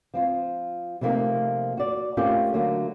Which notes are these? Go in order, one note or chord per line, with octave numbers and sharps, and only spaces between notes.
F3 C4 F4
C3 F3 A3 A#3 C4 D#4
F#4 D5
A3 A#3 C4 C#4 F4 G4
D3 F#3 A3 A#3